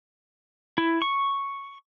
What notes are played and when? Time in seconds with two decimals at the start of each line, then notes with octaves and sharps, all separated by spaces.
0.78 E4
1.02 C#6